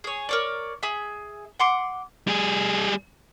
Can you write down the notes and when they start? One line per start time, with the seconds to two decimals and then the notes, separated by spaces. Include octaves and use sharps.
0.04 G#4 C#5
0.29 A#4 C#5 D5
0.83 G#4 E5
1.60 F#5 C6 D6
2.27 G3 G#4